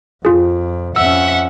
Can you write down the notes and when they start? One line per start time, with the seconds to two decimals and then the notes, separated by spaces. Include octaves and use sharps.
0.25 F2 F4 G#4
0.96 F2 C#4 E5 F#5 E6